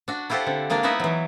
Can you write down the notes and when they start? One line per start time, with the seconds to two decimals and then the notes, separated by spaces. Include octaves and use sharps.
0.08 D4 F#4
0.30 E4 F4 G4 A4 C5 F#5
0.46 D3 C4
0.70 G#3 A#3 D4 D5
0.83 B3 D#4 E4 B4 E5 F#5
1.00 E3 F#3